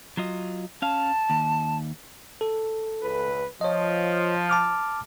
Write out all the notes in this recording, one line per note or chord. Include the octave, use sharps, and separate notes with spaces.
F#3 F4 D#5
C#4 F5 A5
D#2
A4
C#2 B4
F3 C#5 D#5
A5 D6 F6